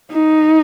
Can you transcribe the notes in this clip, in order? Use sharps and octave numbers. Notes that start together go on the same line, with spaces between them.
D#4